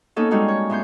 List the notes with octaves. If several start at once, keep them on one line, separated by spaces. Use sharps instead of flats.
A#3 B3 C#4 D#4 A4
G3 G#3 C4 C#4 D#4 F#4
C#5
A2 B3 C6 G6